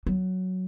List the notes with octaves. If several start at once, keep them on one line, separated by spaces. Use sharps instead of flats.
F#3